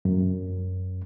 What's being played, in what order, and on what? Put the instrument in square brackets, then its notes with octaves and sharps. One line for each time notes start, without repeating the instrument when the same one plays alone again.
[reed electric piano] F#2